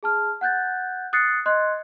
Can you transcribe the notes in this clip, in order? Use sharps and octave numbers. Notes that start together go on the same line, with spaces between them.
G#4 A5 F6
F#5 F#6 G6 A6
D#6 F#6 A6 C7 C#7
D#5 C6 F#6 G#6